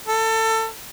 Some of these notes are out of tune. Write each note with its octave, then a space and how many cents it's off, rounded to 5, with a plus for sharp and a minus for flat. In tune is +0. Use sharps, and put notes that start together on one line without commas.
A4 +25